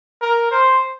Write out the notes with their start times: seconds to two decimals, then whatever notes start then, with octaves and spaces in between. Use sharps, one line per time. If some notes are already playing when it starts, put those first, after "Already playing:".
0.21 A#4
0.51 C5